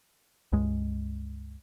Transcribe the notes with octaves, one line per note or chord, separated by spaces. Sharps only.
C#2 G2 G#3